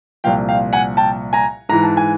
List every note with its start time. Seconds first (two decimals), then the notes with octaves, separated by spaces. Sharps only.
0.24 C2 A#2 F3 F5 G5
0.49 F5 G5
0.73 F#5 G#5
0.97 G5 A5
1.33 G#5 A#5
1.69 G#2 E3 A#5
1.84 A5
1.97 G#5